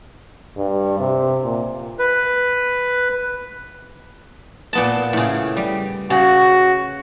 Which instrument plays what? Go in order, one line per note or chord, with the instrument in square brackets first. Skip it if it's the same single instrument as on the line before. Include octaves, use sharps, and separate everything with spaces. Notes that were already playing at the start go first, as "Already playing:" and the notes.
[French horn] G2
C3
A#2
[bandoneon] B4
[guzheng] A#2 B3 A5
A2 C#3
G3
[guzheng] C#3 [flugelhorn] F#4